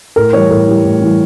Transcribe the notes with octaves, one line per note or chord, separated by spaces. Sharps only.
A2 A#4
E3 G3 C#5
A2 A#4
E3 G3
A2
E3 G3